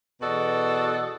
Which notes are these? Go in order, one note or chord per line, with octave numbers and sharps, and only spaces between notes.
E2 B2 F#4 A4 D5 D#5